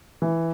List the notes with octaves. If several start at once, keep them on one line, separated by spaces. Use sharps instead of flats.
E3